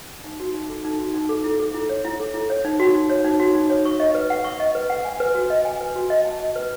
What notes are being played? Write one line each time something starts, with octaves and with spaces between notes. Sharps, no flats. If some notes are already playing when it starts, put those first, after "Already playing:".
D#4
F#4
D#4
A4
D#4
F#4
D#4
A4
E4
A4
E4
C#5
E4
A4
E4
C#5
D#4
F#4
D#4
C#5
D#4
F#4
D#4
C#5
C#6
D#5
B4
F#5
C#6
D#5
B4
F#5
G#5
B4
F#4
D#5
G#5
B4
F#4
D#5
A5
D#5
B4